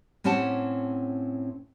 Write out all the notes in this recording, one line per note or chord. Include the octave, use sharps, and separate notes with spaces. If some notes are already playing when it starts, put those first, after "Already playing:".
A2 C4 C#4 G4 F#5 A5